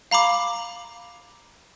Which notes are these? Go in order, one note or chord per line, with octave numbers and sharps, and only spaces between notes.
F5 A#5 B5 D6